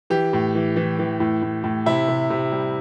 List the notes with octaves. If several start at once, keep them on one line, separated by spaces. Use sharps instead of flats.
E3 G4
A2
E3
E3
E3
A2
A2
A2
C3 E4
C3
C3
G3